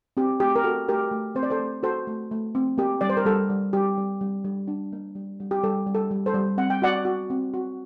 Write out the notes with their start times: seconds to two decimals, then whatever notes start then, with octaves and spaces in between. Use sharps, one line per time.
0.17 C4 G4
0.40 A3 G4
0.56 A#4
0.64 F#4 A4
0.89 A3 G4 A#4
1.12 A3
1.35 C4 C5
1.43 D5
1.50 A4 C5
1.60 A3
1.83 F#4 A4 C5
2.07 A3
2.31 A3
2.55 C4
2.78 A#3 G4
3.01 G3 D5
3.10 C5
3.17 A#4
3.25 G3 A4
3.50 G3
3.73 G3 G4
3.98 G3
4.21 G3
4.44 G3
4.68 D4
4.93 A#3
5.15 G3
5.40 G3
5.51 G4
5.63 G3 A4
5.87 G3
5.94 A4
6.11 G3
6.26 A4 C5
6.34 G3
6.58 C4 F#5
6.70 G5
6.82 F#4 D5 F#5
7.05 F#4
7.30 C4
7.54 F#4